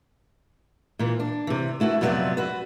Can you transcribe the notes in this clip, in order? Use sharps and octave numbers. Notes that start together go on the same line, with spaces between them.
A#2 E3
D4
C3 E3
A3 E4 F#4 B4
F2 C3 F#3 B3 D5 E5
F#4 B4